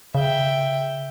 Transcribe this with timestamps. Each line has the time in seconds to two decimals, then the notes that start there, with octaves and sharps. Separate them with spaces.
0.15 C#3 E5 G5